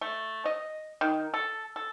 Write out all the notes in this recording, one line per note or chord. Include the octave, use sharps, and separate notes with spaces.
A3
D#5
D#3
A4
A4